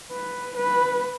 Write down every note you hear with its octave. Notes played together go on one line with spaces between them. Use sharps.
B4
B4